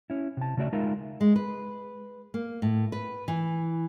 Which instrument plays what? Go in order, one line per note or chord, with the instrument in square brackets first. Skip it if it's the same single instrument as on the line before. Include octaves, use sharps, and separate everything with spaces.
[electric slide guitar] C#4 E4
C3 A5
C#3 A3 F#4 D5 E5
G#3 D#4 F4 A#4 E5
[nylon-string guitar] G#3
B4
A#3
A2
B4
E3